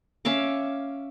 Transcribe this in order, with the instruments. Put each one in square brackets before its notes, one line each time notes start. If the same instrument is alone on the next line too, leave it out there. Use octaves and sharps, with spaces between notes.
[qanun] C#4 E5 F5 D6